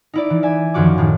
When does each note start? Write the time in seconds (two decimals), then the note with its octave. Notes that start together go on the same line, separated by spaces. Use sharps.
0.13 D#4 E4 D5
0.30 E3
0.42 D5 E5 G#5
0.74 F#2 D#3 F3 F#4 D6
0.98 A2 D#3 G3